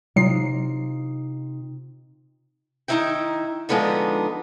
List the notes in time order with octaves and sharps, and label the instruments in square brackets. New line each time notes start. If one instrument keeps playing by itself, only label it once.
[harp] C3 D#4 F4 [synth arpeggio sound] F#3 C7
[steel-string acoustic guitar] D#3 A#3 D#4 E4 E5 G5
D3 F3 G#3 B3 D4 D#4